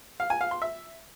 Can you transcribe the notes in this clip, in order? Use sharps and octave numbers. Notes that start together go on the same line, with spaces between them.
F5
G#5
F5
C6
E5